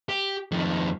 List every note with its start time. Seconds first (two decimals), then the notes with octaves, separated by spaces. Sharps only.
0.09 G4
0.52 F2 D#3